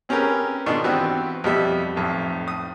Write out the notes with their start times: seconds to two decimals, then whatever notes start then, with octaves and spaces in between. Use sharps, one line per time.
0.09 C4 C#4 G4 G#4 A#4 B4
0.66 G#2 B2 D#3 D4 F4 C#6
0.84 E3 B3 C4 F#4 G4 B4
1.44 F2 B2 G3 E5
1.96 B1 F2 A2
2.48 D#6